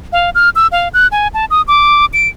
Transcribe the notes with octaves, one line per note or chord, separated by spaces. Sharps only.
F5
F6
E6
F5
F#6
G#5
A5
D#6
D6
D7